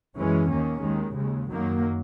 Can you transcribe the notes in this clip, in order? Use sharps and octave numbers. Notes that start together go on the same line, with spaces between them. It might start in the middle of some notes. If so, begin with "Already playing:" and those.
F#2 E3 G#3 C#4
D#2 D#3 A#3 C#4
D#2 D#3 G#3
D#2 C#3 G#3
F#2 D#3 F#3 A#3